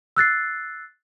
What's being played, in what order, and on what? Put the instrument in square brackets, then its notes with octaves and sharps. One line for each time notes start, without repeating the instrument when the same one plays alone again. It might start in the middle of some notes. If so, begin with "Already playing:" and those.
[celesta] E6 F#6 A6 C7